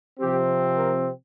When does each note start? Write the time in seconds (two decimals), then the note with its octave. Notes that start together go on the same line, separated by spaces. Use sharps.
0.19 C3 F3 C4 G4
0.76 A#4